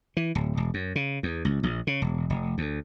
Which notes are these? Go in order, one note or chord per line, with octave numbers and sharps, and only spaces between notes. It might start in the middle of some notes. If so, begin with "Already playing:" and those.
E3
D1
E1
F#2
C#3
E2
C#2
A#1
C#3
E1
F1
D2